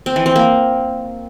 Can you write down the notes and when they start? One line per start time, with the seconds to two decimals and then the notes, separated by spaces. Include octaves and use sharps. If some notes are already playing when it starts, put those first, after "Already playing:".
0.06 C4
0.16 E3
0.26 C4
0.36 A#3